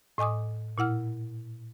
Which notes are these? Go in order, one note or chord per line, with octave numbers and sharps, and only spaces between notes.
A2 D#5 G#5 D6 D#6
A#2 E4 F#5 F6